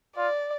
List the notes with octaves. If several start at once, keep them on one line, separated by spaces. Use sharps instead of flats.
F4 D5